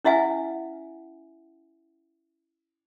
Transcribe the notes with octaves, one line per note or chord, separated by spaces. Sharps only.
C#4 E4 E5 F#5 G#5